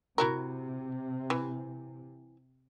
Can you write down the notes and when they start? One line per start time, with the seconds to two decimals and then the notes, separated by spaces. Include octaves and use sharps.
0.18 C3 E4 F#4 A#4
1.30 E3